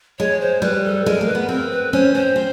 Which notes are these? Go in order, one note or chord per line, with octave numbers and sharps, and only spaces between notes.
G#3 C#5
C5
G3 B4
A4
G#3 A#4
A#3
B4
B3
C4 A#4
B4
C#4 C5
C4 C5
C4